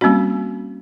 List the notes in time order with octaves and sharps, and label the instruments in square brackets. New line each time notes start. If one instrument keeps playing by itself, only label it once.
[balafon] G3 A#3 C4 C#4 F#4